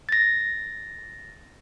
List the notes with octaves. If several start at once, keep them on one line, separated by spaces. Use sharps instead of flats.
A6 A#6